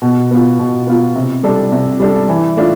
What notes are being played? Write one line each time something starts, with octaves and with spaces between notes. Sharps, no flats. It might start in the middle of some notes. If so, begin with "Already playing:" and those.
B2
B3 F4
B2
B3 F4
C3
G3 D4 A4
C3
G3 D4 A4
E3
A3 D4 F4